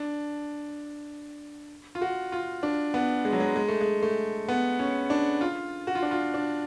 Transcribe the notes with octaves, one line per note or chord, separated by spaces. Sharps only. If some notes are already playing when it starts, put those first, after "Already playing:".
Already playing: D4
F4
F#4
F4
D4
B3
G#3
F#3
G#3
G#3
A3
G#3
A3
B3
C#4
D4
F4
F#4
F4
D4
F4
D4